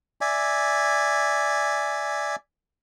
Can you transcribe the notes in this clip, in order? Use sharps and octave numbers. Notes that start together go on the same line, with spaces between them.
D5 E5 G#5